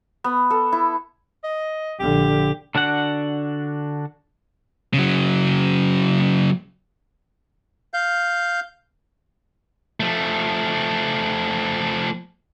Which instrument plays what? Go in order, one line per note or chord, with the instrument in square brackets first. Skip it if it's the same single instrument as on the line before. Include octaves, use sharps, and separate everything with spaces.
[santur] B3
A4
E4
[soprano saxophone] D#5
[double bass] A#1 D3 [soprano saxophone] G4
[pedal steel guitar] D3 D4 F#4 F#5
[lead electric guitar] C#3 F#3
[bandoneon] F5 G6
[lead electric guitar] F3 A3